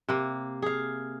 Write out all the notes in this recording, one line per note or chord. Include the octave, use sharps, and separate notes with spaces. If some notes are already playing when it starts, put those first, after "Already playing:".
C3 A#3
G#4 F5